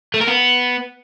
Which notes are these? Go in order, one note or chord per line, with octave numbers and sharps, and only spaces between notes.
A3
A#4
B3